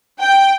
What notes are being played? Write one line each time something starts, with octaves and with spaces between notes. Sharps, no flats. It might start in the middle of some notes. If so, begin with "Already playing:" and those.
G5